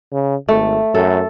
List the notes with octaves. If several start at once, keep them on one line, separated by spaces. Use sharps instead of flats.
C#3
G#1 A3
F#2 A4